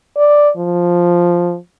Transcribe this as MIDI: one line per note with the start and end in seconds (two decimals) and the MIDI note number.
0.17 0.50 74
0.57 1.57 53